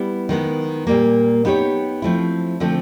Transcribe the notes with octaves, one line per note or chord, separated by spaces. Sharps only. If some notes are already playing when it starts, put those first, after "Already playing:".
Already playing: G3 B3 E4
D#3 G#3 B3
A#2 G3 A#3
B3 D#4 G4 A#4 C#5
F3 A3 C4 E4
D3 F3 A3 C4